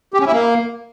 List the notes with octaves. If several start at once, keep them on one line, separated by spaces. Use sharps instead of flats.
G4
C#4
E4
A#3